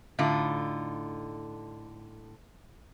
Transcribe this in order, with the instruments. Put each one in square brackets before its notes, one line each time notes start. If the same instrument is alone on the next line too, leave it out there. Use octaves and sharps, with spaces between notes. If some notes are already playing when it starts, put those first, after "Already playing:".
[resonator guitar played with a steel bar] A2 D3 D#4 F4